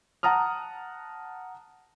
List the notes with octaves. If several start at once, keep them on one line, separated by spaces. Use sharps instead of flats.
F#5 A5 A#5 D#6 F6